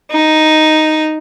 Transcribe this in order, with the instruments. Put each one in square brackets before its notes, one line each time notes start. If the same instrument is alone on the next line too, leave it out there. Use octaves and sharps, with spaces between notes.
[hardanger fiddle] D#4